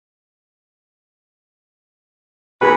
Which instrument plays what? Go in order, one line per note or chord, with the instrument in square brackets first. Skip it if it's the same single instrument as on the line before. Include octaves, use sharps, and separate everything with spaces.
[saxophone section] D#2 F#4 B4 [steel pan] G#4 G#5 B5